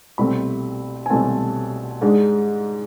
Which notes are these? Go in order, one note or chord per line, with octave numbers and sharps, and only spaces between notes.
C2 B2 A3 C4 B5
G#5
C2 B2 A3 C4 A5
G#2 G#3 D4